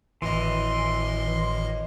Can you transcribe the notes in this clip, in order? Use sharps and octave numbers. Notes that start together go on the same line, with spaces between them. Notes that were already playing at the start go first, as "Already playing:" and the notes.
G#1 A2 E3 D#5 C6